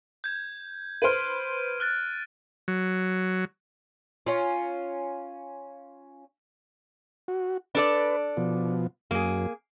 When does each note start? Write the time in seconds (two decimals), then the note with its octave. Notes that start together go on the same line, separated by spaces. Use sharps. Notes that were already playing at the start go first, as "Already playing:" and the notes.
0.24 G6 G#6
1.02 B4 C5 F6 D7 D#7
1.80 F6 F#6 A6
2.68 F#3
4.26 C#4 F4
7.28 F#4
7.75 D4 A4 B4 D5
8.37 B2 F3
9.11 F#2 A#3 G#4